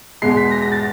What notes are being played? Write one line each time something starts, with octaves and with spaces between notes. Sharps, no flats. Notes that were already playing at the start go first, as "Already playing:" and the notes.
E2 B2 G#3 C7
B6
A#6
A#6
A6